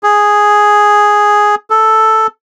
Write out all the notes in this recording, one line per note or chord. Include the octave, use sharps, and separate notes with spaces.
G#4
A4